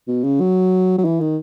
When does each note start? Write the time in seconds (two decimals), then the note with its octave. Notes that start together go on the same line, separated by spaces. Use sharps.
0.07 B2
0.24 C#3
0.40 F#3
0.98 F#3
1.05 E3
1.20 D#3